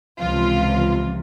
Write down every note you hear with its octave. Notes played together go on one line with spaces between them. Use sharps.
C#2 C3 E3 F3 F4